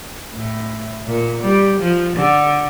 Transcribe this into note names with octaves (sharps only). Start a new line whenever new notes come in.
A2
A#2
G3
F3
D3